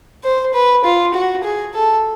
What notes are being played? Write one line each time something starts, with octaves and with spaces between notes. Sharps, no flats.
C5
B4
F4
F#4
G#4
A4